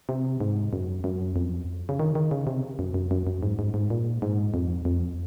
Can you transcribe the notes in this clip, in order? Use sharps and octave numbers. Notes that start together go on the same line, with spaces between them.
C3
G#2
F#2
F#2
F2
C#3
D#3
D#3
C#3
C3
F#2
F#2
F#2
F#2
G#2
G#2
G#2
A#2
G#2
F2
F2